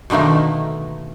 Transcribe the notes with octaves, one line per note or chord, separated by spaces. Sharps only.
B2 D3 D#3 A3 A#3